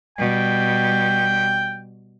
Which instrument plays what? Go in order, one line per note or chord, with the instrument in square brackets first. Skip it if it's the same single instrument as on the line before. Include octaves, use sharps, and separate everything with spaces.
[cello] B2 G3 [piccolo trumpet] G5